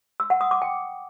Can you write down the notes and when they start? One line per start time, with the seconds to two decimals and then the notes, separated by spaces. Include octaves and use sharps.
0.20 E6
0.30 F#5
0.41 D#6
0.51 D6
0.62 G5